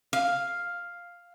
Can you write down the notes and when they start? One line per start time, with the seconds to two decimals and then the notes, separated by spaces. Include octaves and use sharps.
0.13 F5